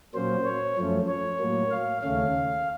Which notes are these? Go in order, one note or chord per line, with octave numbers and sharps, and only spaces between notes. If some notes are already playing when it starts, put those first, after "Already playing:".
A#2 F#3 A#3 C#4 C5
C#5
F#2 F3 A3 C#4
C#5
A2 F#3 A#3
F5
D#2 C#3 A3 C#4 F5